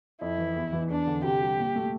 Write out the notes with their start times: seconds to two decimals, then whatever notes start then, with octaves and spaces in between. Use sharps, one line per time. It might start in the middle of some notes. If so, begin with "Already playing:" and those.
0.21 F2 E4
0.38 E3
0.56 E2
0.73 E3
0.90 E2 D4
1.07 D3
1.24 C3 G4
1.41 G3
1.59 A#2
1.76 A3